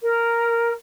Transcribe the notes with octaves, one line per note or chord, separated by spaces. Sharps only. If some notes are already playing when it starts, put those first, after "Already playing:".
A#4